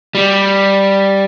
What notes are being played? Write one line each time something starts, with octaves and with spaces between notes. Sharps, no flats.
G3